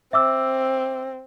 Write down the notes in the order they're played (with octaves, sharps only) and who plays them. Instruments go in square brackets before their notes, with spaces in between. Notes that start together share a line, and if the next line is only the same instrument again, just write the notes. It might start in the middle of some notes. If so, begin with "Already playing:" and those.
[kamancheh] C4 [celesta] E5 D6 E6